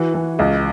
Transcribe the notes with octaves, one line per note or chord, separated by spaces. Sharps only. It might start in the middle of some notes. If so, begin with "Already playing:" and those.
Already playing: E3 F#4
E3
C#2